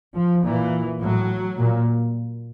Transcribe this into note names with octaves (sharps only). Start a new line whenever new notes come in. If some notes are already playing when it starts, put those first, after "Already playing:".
F3
A#2 E3
A2 F#3
A#2